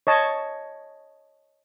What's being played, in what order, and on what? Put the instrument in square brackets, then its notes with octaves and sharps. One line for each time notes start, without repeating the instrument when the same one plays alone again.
[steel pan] C#5 D#5 A5